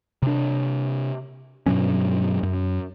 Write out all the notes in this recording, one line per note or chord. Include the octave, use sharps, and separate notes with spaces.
C3 D4
G2 B2 F#3 C#4
F#2